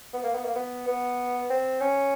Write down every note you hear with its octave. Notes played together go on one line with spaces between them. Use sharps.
B3
A#3
B3
A#3
B3
B3
C4
C#4